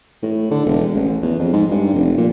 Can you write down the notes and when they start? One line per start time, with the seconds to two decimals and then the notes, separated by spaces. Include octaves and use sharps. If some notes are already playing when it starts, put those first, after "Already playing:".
0.22 A2
0.50 D3
0.66 E1
0.95 A1
1.22 E2
1.38 F2
1.53 G#2
1.71 G2
1.93 F1
2.17 A#2